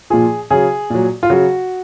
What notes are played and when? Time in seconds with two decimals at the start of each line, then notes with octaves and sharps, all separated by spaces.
0.10 A#2 F3 G#4
0.51 C#3 F#3 G#4
0.90 A#2 F#3
1.23 F4
1.30 C#3 F#3 F#4